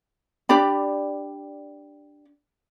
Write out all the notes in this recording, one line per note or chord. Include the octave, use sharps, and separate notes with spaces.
D4 G4 D5 B5